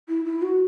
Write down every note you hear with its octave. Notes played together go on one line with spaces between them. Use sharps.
E4
E4
F#4